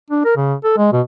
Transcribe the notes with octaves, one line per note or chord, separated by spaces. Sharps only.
D4
A#4
C#3
A4
G#3
B2